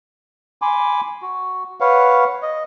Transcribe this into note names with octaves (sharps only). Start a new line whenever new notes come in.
G#5 B5 C6 D6
F#4
B4 C#5 F5 F#5
D#5